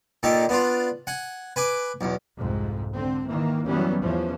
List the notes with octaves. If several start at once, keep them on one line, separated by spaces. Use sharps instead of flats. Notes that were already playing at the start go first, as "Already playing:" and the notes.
A#2 D#3 G4 A4
B3 D4 F4
F#5 G#5
B4 G#5 D6
B1 E2
C2 F2 G#2
D3 C4
D#3 E3 A#3
F#2 E3 F#3 G3 B3 C#4
E2 E3 F3 C#4